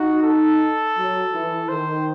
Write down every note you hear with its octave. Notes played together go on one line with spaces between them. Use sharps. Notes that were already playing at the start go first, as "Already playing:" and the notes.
Already playing: D#4 F#4
A4
F#3
E3
D#3 C5